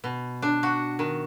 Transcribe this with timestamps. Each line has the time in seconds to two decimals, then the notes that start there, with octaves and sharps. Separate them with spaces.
0.04 B2
0.42 D4
0.63 F#4
0.99 D#3